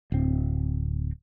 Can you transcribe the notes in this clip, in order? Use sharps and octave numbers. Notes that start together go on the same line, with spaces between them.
D1 C4